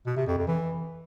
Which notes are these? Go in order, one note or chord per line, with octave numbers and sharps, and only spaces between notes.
B2
C3
F2
F2
E3